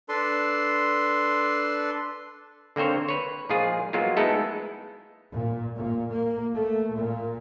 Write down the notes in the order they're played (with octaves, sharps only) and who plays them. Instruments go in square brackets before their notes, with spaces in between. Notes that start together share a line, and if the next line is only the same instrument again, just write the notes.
[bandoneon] D4 A4 B4 C6
[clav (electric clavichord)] D3 A#3 C4 C5 C#5
B4 C#5
A#2 F3 G#3 F4 G#4
F#3 G#3 A#3 B3 F4
G#3 A3 B3 D#4 E4 A4
[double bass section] A#2
A#2
A#3
A3
A#2